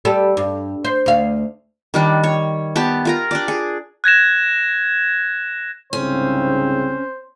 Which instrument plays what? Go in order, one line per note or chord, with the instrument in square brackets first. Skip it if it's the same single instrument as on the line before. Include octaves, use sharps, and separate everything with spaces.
[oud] G3 A4
G2
C5
D2 F5
[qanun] D#3 G3 D4
C#5
B3 G4 A5
F4 A#4 A#5
D4 G4 D5
G#4
[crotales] F#6 G#6 A#6 E7
[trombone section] C2 G#2 C#3 [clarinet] C4 [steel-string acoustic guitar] C#4 [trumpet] C5